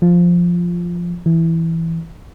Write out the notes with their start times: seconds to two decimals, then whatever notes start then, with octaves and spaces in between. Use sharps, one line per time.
0.02 F3
1.26 E3